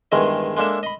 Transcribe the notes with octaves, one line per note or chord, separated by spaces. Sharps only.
E2 G2 D#3 G#3 D#5
G#3 A#3 D4 A4 E5
D#5 B5